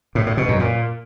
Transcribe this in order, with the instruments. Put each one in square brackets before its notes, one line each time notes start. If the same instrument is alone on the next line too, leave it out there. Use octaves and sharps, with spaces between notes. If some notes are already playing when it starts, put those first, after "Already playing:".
[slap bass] A2
A2
B2
F#2
A#2